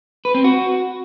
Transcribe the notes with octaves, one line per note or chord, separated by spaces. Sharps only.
B4
C4
F#4